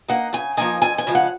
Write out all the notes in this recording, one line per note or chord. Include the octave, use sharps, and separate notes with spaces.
A#3 D#4 F#5
C#3 G#5
F3 A#3 D#4 G#5
F2 G#5
G#5
C#3 F3 G#3
F#5